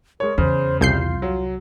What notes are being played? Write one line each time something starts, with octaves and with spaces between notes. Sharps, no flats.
G#3 A#4 C#5
E2 C#3 C5
C2 F4 G6 C7
F#3